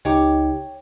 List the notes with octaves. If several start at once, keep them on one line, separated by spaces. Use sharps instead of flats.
C#2 D#4 G4 C#5 G5 D6